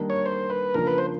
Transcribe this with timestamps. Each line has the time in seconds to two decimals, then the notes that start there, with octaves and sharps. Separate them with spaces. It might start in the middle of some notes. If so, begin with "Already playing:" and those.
Already playing: D#3 G3 A#3 D4
0.10 C#5
0.26 C5
0.50 B4
0.74 C#3 F3 A#3 D4 A#4
0.87 B4
0.98 C5